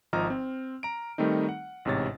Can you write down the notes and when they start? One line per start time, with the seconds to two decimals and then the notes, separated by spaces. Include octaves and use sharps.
0.13 G#1 F3 D#5 A#5 F6
0.30 C4
0.83 A#5 D7
1.18 D#3 G3 A3 C4 D#4
1.49 F#5
1.85 A1 G#2 C3 C#5 A6